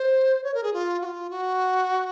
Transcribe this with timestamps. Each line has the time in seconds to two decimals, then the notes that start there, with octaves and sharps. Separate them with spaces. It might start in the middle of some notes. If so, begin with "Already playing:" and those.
Already playing: C5
0.44 C#5
0.54 A#4
0.63 G#4
0.73 F4
1.02 F#4
1.05 F4
1.30 F#4